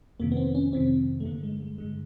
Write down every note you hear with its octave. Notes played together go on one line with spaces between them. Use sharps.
F2 C3 D#3 A#3
B3
C4
C#4
F2 C3 D#3 C4
A3
G2 D3 A#3
G#3
G#3
G2 D3 G#3